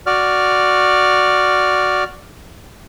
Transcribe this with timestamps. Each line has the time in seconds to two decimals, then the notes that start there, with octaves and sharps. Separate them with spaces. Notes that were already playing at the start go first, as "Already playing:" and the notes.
0.06 F#4 D5 F6